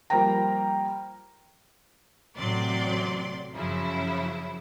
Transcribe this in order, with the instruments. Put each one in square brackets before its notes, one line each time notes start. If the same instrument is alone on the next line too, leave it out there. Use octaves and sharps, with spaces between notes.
[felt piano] F3 G3 A#3 C5 G5 A#5
[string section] A1 C3 F#3 D5 C6
F#2 C#3 F3 F#3 E4